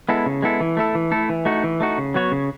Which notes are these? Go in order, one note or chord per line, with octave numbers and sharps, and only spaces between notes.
G#3 B3 E4 A4
C#3
G#3 B3 E4 A4
E3
A3 E4 A4
E3
A3 E4 A4
E3
A3 D#4 F#4
E3
A3 D#4 F#4
C#3
F#3 B3 F#4 C#5
C#3